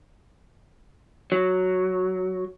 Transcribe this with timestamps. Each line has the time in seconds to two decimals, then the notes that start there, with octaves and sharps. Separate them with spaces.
1.32 F#3